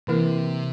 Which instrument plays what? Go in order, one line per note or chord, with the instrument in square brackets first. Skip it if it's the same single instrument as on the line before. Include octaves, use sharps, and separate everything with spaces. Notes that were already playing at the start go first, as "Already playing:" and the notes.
[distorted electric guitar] C3 [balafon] E3 A#3 E4 A#4